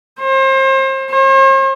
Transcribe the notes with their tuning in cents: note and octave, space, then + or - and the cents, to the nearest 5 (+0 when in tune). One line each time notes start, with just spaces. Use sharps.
C5 +35
C5 +45